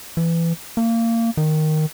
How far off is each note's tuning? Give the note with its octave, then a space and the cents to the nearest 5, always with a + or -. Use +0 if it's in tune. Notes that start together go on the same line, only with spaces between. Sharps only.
E3 +20
A#3 -25
D#3 -5